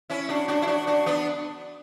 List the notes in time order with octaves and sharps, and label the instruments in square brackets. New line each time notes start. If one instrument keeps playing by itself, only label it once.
[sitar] C#4 E4
D4 F#4
D4 F#4
E4
D4 F#4
D4 F#4
B3 D4